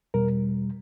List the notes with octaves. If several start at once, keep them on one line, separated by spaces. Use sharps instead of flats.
E2 B2 G3 A#4